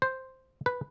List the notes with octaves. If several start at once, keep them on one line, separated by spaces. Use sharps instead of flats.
C5
B4